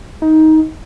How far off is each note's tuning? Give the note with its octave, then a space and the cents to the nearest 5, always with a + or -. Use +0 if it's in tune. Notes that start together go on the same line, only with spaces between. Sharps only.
D#4 +15